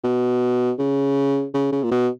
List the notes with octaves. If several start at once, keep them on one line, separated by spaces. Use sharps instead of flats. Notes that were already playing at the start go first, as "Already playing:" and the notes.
B2
C#3
C#3
C#3
A#2
B2